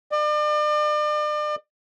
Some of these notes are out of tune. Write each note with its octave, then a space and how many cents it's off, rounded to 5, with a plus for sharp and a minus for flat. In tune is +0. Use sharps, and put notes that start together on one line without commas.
D5 +40